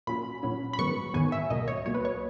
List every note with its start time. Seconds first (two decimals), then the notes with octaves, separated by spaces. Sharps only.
0.07 A#2 F#3 C#4 B5
0.43 A#2 F#3 C#4
0.73 B5
0.79 G#2 D#3 F#3 B3 C#6
1.14 G#2 D#3 F#3 B3 G#5
1.32 E5
1.50 C#2 B2 F#3 A#3 D#5
1.68 C#5
1.85 C#2 B2 F#3 A#3 C#5
1.94 B4
2.05 C#5